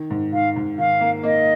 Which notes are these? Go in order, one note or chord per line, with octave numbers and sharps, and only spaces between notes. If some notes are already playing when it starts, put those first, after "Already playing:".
Already playing: D#3
G#2
D#3 F5
G#2
D#3 F5
A#3
A#3 D#5